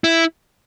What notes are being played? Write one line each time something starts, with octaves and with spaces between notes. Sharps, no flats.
E4